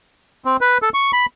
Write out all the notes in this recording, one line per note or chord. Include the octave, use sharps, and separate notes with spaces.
C4
B4
A4
C#6
B5